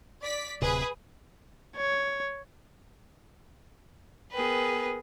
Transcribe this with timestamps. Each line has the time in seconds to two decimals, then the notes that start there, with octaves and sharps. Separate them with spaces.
0.22 D5 B6
0.62 D1 C3 G#4 B4
1.76 C#5
4.33 B3 G#4 A#4 B4 G5